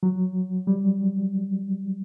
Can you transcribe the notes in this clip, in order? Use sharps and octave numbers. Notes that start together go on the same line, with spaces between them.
F#3
G3